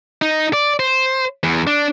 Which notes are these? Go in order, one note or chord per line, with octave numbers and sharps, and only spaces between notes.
D#4
D5
C5
E2
D4